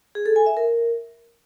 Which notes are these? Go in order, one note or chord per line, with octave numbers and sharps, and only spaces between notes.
G#4
A4
G#5
E5
A#4